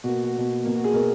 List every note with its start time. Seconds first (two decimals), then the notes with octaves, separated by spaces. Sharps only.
0.04 B2 A#3 F#4
0.24 F#4
0.33 B2 A#3
0.64 B2 A#3
0.75 F#4
0.84 G#4
0.93 B2 A#3 A#4